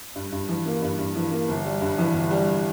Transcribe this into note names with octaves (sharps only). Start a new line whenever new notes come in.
G2
G2
E3
A#3
G2
G2
E3
A#3
G1
G3
G2
E3
G1
G3